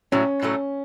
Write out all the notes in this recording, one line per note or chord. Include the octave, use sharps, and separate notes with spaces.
A2 F#3 A3 C#4
A2 F#3 A3